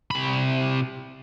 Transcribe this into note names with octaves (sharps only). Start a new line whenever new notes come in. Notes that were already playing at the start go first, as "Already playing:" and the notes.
C3 B5